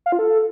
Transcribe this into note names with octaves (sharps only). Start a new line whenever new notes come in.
F5
F4
A4